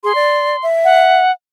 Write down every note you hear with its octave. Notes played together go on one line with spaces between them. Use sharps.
G#4 C6
D5
E5
F#5